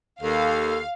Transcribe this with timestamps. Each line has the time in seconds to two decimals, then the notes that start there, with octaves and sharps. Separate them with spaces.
0.22 D#2 A4 F5